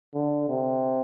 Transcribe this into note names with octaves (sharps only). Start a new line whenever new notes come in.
D3
C3